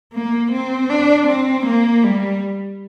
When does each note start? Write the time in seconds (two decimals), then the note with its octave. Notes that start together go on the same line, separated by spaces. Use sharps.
0.13 A#3
0.52 C4
0.89 D4
1.28 C4
1.66 A#3
2.04 G3